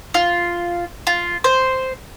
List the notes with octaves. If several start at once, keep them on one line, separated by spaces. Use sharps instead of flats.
F4
F4
C5